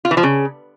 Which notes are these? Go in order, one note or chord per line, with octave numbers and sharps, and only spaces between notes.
F4
E3
F3
C#3